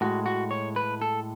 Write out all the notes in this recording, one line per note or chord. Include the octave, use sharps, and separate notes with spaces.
A2 G#3 F#4
F#4
C#5
B4
A4